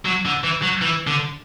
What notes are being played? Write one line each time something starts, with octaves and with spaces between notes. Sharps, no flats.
F#3
D3
E3
F#3
E3
D3